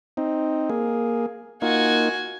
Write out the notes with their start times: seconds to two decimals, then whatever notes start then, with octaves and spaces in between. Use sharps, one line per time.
0.17 C4 D#4
0.70 A#3 G#4
1.62 A#3 D#4 F4 F#4 G#5